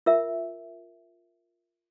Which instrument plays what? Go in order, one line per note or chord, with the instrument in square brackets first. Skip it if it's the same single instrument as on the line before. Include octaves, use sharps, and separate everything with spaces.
[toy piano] F4 A#4 E5